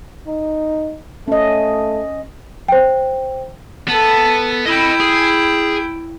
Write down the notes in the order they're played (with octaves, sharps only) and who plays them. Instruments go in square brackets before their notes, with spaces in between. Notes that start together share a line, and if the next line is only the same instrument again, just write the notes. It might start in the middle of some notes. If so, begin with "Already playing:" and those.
[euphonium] D#4
[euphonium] A3 [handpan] C#4 D#5
[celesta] C5 G5
[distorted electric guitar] B3 [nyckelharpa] A4 A5
[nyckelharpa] E4 G5 [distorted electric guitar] D#5 B5
[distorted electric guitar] G#4